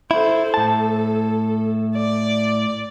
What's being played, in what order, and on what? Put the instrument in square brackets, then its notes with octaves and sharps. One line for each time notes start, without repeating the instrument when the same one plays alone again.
[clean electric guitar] E4 [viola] A4 C5
[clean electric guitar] A2 A5 [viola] A4
[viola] D5